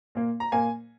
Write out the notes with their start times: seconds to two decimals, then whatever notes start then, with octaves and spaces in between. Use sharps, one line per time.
0.15 A#2 A#3
0.40 A#5
0.52 A#2 A#3 G#5